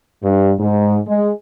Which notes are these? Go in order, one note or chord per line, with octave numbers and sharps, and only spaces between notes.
G2
G#2
G#3